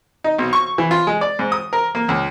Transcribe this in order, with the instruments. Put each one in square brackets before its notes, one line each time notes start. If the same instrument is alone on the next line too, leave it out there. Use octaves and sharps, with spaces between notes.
[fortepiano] D#4
B1
C#6
E3
F4
G#3
D5
G#2
D#6
A#4
A#3
C#2